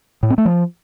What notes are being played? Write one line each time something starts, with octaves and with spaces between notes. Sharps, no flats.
A2
C4
A3
F3